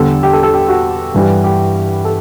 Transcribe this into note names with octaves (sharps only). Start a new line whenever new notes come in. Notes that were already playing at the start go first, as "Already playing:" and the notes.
Already playing: E2 D3 G3 A4
G4
A4
A4
G4
F#4
G2 E3 G3
G4
A4